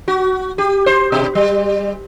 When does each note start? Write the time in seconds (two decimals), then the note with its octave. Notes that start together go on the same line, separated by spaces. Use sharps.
0.08 F#4
0.58 G4
0.86 C5
1.12 B2
1.35 G3